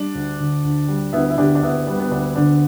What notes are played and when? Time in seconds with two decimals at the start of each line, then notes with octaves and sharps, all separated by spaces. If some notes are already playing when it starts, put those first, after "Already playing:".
Already playing: G3 D4
0.15 D2
0.40 D3
0.64 D2
0.88 G3
1.13 D2 B3 E4
1.30 E4
1.37 D3 D4 G4
1.55 D4
1.62 D2 B3 E4
1.87 G3 B3
2.00 B3
2.11 D2 D4
2.36 D3 D4